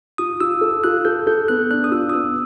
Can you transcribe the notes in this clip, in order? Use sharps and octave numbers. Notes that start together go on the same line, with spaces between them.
F4 D#6
F4 E6
A4
F4 F#6
A4 G6
A4 G6
B3 F#6
D4 F#6
D#6
F4 E6
D#6
B3 E6